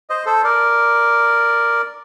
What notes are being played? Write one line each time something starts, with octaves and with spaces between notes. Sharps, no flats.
C5 D#5
A4 C5
A#4 D5